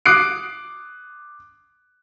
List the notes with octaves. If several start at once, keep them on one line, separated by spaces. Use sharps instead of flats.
D6 D#6 F#6 C7 D7